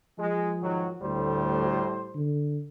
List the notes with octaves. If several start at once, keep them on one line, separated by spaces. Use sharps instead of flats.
F3 G#3
G#2 D#3 F#3
D2 A2 G3 C5
D3